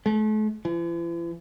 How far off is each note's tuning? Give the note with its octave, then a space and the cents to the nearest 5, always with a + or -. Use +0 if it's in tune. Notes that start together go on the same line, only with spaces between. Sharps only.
A3 -40
E3 +45